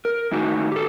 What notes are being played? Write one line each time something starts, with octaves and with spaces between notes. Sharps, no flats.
A#4
A2 D#3 D#4 F#4
G4 A4